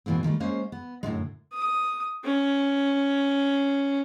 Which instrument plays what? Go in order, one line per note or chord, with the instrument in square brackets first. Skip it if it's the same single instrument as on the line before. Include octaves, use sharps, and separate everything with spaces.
[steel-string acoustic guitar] G#2 B2 E3 A#3 C4
D#3 F3 G3 A3
G#3 A#3 C#4 C5
B3
F#2 A2 D3 G#3
[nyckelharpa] D#6
C#4